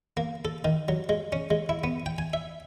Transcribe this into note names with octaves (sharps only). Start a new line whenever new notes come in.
A#3
A4
D#3
F#3
G#3
C#4
G#3
E4
B3
G5
G#5
E5